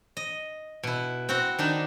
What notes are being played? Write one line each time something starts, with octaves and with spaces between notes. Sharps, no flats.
D#5
B2 E4
C4 F#4
D#3 D4 D#4